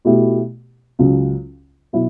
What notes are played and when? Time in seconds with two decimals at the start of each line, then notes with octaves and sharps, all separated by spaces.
0.05 B2 A3 E4 G4
0.99 C#2 C#3 F#3
1.93 B2 F#3 E4